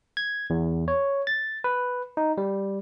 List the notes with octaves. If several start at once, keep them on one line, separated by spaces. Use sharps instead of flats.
G#6
E2
C#5
A6
B4
D#4
G3